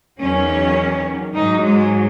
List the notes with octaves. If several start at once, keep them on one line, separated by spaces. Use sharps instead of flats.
E2 D#3 F#3 C#4
G#2 F#3 D#4
G#3